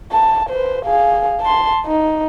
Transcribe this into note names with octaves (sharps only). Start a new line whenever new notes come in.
A5
B4 C5
G#4 F5
A5 C6
D#4